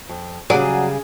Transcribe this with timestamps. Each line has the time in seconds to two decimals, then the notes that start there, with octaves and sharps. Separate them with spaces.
0.09 F2
0.50 C#3 F#3 G3 G#4 D5